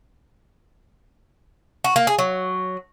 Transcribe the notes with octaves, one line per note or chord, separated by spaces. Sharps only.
F#4
A#3
G#4
F#3